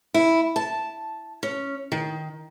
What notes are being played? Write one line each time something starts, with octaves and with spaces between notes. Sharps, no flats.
E4
A5
C#4
D#3